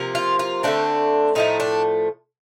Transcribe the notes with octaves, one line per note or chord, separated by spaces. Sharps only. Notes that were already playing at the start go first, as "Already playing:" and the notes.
Already playing: C3 F3 A#3
F4
F4
D3 A3 C4 D4
A2 F3 A3 D#4
D4